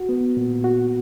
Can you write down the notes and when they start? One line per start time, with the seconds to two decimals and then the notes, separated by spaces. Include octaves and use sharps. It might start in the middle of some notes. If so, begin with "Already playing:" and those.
Already playing: F#4
0.09 B3
0.37 A#2
0.64 F#4